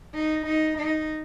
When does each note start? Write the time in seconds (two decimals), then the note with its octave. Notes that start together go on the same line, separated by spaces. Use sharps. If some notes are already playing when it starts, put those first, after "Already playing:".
0.14 D#4
0.46 D#4
0.78 D#4